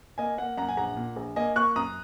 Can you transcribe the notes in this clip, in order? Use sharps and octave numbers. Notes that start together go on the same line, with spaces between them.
A#3 D#5 G#5
A#3 F#5
F#2 F#5 A#5
G#5
A#1 F#5 A#5
A#2
A#1
A#3 D#5 G#5
A#3 C#6 F#6
F#2 A#5 D#6